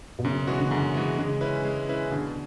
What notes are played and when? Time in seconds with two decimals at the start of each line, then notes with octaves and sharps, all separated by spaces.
0.19 B2
0.24 F#2 C#3
0.47 E3 G#3 B3 F#4
0.60 C#3
0.71 F#2 D3
0.94 E3 G#3 B3 F#4
1.18 C#3 G#3
1.41 C#4 E4 B4
1.65 G#3
1.89 C#4 E4 B4
2.11 B2 D3